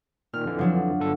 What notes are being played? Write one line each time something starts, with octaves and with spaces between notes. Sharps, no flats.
A#2 D#3 F6
F2 D3 E3
F3 F#3 D4
G1 D3 A4